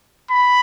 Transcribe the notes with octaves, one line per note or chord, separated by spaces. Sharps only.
B5